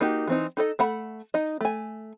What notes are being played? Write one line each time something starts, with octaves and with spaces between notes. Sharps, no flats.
A#3 D#4 F#4 G4
E3 C4 D#4
D#4 A4 D#5
A3 F#5 B5
D#4 D#5
A3 G#5